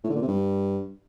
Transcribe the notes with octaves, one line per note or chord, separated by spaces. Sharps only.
A2
D3
A#2
C3
G2